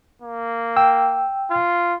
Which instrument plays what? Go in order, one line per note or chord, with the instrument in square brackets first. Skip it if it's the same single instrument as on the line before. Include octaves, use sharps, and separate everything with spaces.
[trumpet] A#3
[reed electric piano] G5 E6
[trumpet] F4